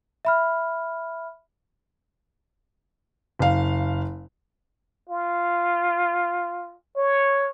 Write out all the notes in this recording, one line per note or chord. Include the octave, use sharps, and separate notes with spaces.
E5 B5 F6
F#1 F5
F4
C#5